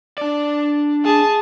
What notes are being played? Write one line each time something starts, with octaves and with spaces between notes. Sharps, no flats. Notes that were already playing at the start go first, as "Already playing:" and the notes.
D4 D5
G#4 A5